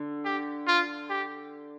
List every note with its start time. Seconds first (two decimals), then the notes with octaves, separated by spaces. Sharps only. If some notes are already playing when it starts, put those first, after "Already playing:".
Already playing: D3
0.25 G4
0.67 F4
1.10 G4